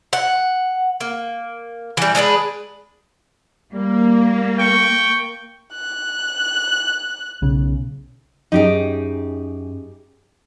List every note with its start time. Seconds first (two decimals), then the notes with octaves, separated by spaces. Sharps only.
0.13 F#5
1.01 A#3
1.97 E3 G3
2.15 G#3 D4 G#4 B4
3.73 G3 A#3
4.59 G5 C#6
5.75 F#6
7.42 B1 C#3
8.52 F#2 D#4 G4 G#4